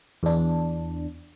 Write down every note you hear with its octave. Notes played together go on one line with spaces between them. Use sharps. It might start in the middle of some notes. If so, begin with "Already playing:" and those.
E2 D4